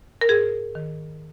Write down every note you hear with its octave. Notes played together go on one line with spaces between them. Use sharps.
A#4
G#2 G#4
D#3